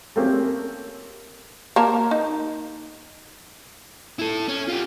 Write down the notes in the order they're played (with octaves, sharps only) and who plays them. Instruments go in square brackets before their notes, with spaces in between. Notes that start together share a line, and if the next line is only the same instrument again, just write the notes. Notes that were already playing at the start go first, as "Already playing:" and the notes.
[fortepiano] A3 A#3 C4 C#4 G4 G#4
[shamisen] A#3 A#4 A5
D#4
[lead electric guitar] E4 A4
C#4
F4 G4